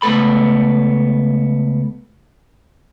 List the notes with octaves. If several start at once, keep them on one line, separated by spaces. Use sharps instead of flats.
C#2 A3 B3 A4 B5